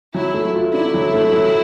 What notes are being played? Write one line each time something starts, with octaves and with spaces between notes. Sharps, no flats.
F#3 E4
A3
F4
D4 E4
F#3
A3
F#3